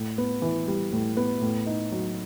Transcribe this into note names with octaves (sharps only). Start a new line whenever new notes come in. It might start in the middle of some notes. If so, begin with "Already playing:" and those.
Already playing: A2
B3
E3
G3
A2
B3
A2
D#4
F#3